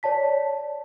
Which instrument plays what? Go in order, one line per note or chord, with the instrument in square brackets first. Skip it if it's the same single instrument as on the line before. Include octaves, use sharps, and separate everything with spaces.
[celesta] C#5 D5 A5 B6